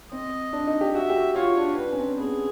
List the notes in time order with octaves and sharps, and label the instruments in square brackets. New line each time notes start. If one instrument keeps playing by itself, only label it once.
[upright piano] C4 [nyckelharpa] D#5
[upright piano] D4
D#4
G4
[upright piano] F#4 [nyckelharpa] E5
[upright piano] G4
F#4
[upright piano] F4 [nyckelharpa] C#5
[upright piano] D4
[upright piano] D4 [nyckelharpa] B4
[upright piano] C#4
C4
[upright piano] B3 [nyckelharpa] G#4